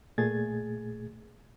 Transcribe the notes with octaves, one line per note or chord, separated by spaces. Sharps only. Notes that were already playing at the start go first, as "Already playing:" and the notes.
A#2 A3 G#4 G#6 A6